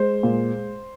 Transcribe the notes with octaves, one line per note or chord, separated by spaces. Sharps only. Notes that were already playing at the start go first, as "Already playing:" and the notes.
Already playing: G#3 C5
A#2